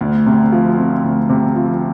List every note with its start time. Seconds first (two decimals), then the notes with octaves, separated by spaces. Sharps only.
0.01 D2
0.26 C3
0.52 F3
0.78 C4
1.04 D2
1.29 C3
1.56 F3